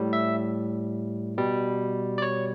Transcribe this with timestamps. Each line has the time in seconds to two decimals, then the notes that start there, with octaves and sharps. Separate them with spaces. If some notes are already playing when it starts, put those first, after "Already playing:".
Already playing: A2 G3
0.13 E5
1.37 B2 G3
2.18 D5
2.22 C#5